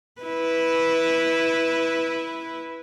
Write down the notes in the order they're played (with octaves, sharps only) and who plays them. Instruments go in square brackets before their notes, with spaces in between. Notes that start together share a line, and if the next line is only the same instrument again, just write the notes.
[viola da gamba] E4 B4